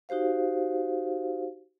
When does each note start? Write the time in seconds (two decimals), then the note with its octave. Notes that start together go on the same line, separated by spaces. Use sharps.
0.09 D#4 F#4 G4 C5 F5